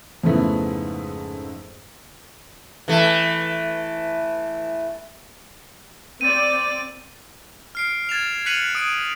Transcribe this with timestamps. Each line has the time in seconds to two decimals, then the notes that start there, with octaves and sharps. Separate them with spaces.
0.23 F2 G#2 C#3 A3 B3 E4
2.88 E3 A3
6.21 C4 D5 A6 D#7
7.75 F6 C7 D7
8.09 G#6 A6 E7 F7
8.46 F#6 B6 C#7 D#7 F7 F#7
8.75 D#6 D7